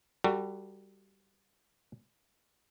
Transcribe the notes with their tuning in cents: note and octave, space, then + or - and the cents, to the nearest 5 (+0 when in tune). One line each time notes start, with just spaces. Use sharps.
G3 +0 F#4 +10 A4 +40